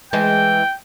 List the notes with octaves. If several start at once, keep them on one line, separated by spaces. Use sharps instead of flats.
E3 G#3 G5